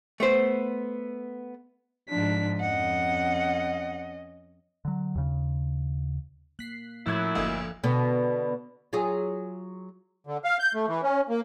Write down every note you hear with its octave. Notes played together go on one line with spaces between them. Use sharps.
A3 B3 C5
G#2 F3 D4 B6
F2 C#4 D#5 F#5
D3 F#3
D#2 C#3
A#3 F#6 B6 C7
F#2 A2 F3 E4 E6 F#6 G#6
G1 D2 A#3 D#5 F5 G#6
B2 D3 B3
F#3 F4 G#4
D3
F5
G6
A3
E3
C#4
A#3